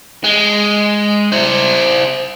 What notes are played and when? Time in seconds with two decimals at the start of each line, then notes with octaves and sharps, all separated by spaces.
0.24 G#3
1.32 E4 C5